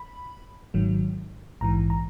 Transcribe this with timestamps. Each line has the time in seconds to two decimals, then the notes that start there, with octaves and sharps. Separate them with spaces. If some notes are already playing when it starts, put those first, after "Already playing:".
Already playing: B5
0.74 G#1 G#2 D#3 F#3
1.61 A#1 G#2 E3 A#5
1.90 A#5